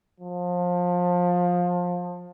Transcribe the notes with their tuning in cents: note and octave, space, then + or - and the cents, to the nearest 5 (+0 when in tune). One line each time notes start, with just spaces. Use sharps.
F3 +25